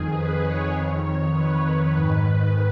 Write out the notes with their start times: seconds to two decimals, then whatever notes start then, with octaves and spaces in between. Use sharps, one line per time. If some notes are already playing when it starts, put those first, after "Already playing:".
Already playing: F2 D#3 G#4
0.12 B4
0.42 C#5
0.71 F2 D#3 C#5
1.01 C#5
1.31 B4
1.60 C#5
1.90 G#2 D#3 B4